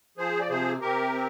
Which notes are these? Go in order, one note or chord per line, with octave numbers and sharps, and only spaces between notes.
F3 G#4 C5
D5
C3 G#4 C5
C3 G4 A#4
C4